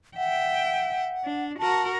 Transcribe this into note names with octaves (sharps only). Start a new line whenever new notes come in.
E5 F#5 G5
D4
F#4 A#4 A5